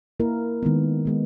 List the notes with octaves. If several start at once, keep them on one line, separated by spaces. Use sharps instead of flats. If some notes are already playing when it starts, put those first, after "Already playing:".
A#3 E4 A#4
D#3 G#3 B3
D#3 G#3 B3